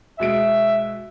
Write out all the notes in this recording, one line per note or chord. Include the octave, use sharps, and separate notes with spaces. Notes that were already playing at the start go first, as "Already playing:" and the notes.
B2 G#3 E5 D7